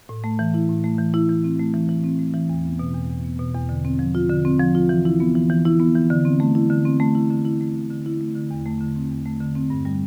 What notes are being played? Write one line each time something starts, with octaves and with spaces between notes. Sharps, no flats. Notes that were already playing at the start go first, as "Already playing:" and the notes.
A2
A3
E3
E4
A2
A3
E3
E4
E3
C4
A3
E3
E3
C4
A3
E3
E2
B3
B2
E2
E2
B3
B2
E2
D3
C4
F3
F4
D3
C4
F3
F4
E3
E4
B3
E3
E3
E4
B3
E3
D3
C4
A3
E4
D3
C4
A3
E4
D3
E4
A3
D3
D3
E4
A3
D3
E2
A3
D3
C4
E2
A3
D3
C4
G2
G3